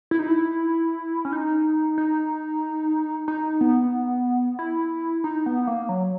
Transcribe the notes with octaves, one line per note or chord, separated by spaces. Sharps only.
E4
D#4
E4
C#4
D#4
D#4
D#4
B3
E4
D#4
B3
A#3
F#3